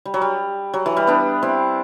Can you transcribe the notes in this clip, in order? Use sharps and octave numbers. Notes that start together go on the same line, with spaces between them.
G3
F#3
G3
F#3
E3
G3
B3 D4
C4 E4